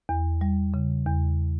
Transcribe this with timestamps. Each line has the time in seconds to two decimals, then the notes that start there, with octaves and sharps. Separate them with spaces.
0.09 E2
0.41 G3
0.74 C#3
1.07 E2